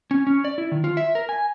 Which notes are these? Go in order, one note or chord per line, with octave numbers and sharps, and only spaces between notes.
C#4
C#4
D5
E4
D#3
F4
E5
A#4
G#5